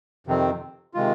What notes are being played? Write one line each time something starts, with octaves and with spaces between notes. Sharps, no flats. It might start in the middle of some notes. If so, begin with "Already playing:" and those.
F2 C3 D#3 C4
C3 D#3 G#3 F4